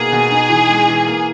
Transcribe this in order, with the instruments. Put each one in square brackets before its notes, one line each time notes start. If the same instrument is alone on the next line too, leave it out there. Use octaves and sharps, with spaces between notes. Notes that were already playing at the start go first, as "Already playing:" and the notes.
Already playing: [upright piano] B2 A#3 D#4 [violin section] G#4
[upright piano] B2
D#4
E3
G#3
E3
A#3